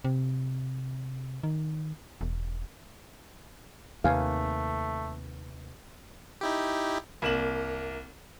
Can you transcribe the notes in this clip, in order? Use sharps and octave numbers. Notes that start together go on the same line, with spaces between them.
C3
D#3
E1
D#2 C3 A3 B4 F5 G#5
D#4 E4 G4
C2 A#3 E7 F#7